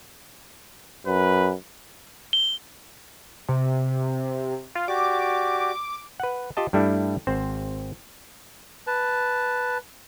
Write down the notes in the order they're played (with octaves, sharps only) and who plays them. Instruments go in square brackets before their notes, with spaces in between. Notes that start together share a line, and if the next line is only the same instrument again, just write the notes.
[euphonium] F#2 [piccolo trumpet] B4
[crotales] G7
[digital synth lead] C3
F4
[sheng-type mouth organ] F#4 G4 D5 [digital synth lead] D6
[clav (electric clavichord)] B4 F#5
F4 G4 D#5 A5
G2 G3 A3 D4 E4
G#1 C4 C5
[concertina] B4 A5